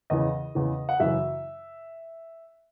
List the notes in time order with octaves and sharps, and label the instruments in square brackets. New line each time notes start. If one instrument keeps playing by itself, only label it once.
[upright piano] E2 C#3 E3 D#5
E2 C#3 E3
F#5
F#2 C#3 E3 E5